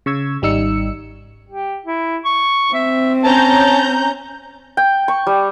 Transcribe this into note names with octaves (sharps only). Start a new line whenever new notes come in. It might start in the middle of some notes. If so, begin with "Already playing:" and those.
C#3 C#6 E6 G#6
G#1 G3 D#4 E6 C#7
G4
E4
C#6
C4 E5
C#4 A5 A#5 G6
G5
C#6
G3